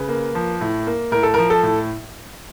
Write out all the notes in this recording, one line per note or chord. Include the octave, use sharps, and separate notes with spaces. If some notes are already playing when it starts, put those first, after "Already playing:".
Already playing: C#3 B4
A#3
F3
A2
A#3
A2 A#4
A4
F3 A#4
A4
A2